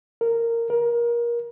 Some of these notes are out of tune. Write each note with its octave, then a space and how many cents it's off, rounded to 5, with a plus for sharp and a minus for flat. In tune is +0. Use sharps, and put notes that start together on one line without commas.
A#4 -10
A#4 +25